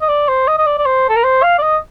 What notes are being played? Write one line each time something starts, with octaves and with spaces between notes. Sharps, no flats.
D#5
D5
C5
D#5
D#5
D5
D5
C5
A4
A#4
C5
F5
D5
D#5